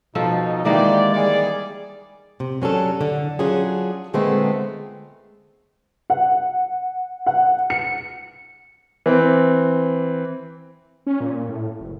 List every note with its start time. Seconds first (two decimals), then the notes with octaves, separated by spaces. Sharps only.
0.15 B2 F3 D#4 F4 A4
0.65 D#3 E3 G#3 A#3 D#4 G4 D5
1.11 G3 G#4 D5
2.40 C3
2.62 F#3 C#4 D4 A4
3.01 D3
3.39 F#3 C#4 D4 F4 G#4
4.14 A#2 D3 G#3 A3 B3 C4
6.10 F#5
7.26 F#5
7.70 C#7
9.06 E3 C4
11.06 C#4
11.20 A#2
11.49 A2
11.80 F#1